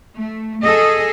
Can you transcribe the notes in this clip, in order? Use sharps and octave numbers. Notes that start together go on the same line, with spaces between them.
A3
G#4 A4 D#5